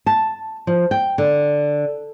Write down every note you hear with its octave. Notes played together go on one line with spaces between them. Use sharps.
A5
F3
G5
D3